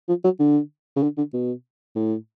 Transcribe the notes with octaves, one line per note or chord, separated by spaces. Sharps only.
F3
F#3
D3
C#3
D3
D3
B2
A2